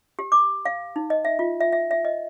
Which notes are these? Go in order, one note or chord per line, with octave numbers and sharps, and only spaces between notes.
G4
D6
F5
D#4
D#5
E5
F4
E5
E5
E5
D#5